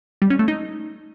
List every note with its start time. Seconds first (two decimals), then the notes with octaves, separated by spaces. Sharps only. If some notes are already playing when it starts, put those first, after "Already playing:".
0.22 G3
0.30 C#4
0.39 A3
0.48 D#4